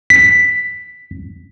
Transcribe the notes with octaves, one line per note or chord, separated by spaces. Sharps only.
B6